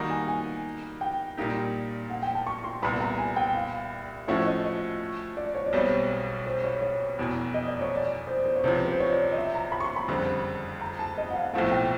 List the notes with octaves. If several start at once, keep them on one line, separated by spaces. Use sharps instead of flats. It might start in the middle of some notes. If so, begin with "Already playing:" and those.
Already playing: D#3 G3 A#3 D#4 F#4
G#5
G#5
G5
A#2 G3 A#3 D#4 G4
F#5
G5
A5
C#6
C6
C2 A#2 G3 B3 B5
A#5
G#5
G5
F5
A2 F3 A3 C#4 F#4 E5
D#5
D#5
D5
C#5
D5
B1 B2 G3 C4 C#5
C5
C#5
C#5
F1 E2 B2
D#5
D5
C#5
D5
C5
C5
C#5
C#2 C3 F3 C5
B4
C5
C#5
D5
D#5
E5
A#5
B5
C#6
C6
B5
F#1 F2 D3 G3 C4
A#5
A5
D#5
F#5
F5
B1 A2 F3 A3 C4 F#5
G5